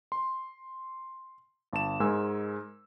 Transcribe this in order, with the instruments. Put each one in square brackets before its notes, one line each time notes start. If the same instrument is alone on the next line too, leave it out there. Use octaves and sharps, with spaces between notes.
[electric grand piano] C6
G1 A5 E7
G#2 G#3 A#4 G#5 E6